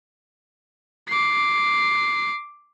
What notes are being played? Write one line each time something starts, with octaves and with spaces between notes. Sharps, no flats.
D6 C7